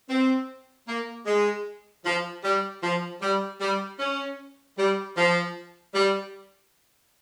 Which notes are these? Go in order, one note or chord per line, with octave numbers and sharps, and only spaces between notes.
C4
A#3
G#3
F3
G3
F3
G3
G3
C#4
G3
F3
G3